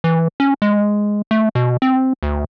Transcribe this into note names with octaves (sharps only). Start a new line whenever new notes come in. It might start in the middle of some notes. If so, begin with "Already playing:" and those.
E3
C#4
G#3
A3
B2
C4
D2